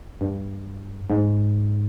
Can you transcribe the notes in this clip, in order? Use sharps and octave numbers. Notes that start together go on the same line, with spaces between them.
G2
G#2